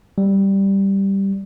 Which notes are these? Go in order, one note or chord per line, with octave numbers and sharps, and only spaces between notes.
G3